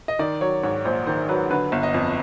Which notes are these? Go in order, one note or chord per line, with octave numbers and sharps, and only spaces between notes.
D#5
D#3 D5
F#3 C#5
G#2 C#5
A#1 C5
D#3 C5
F#3 B4
D3 B4
G1
D#5
F2